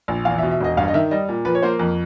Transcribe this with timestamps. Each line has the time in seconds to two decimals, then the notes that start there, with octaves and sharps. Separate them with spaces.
0.08 A#1
0.25 E2 F5
0.38 E5
0.43 B2
0.51 E5
0.60 E1 D#5
0.77 G2 F5
0.88 D#5
0.94 D#3 E5
1.11 G3 D#5
1.29 A#2
1.45 F3 B4
1.55 C#5
1.63 A#3 C5
1.79 F2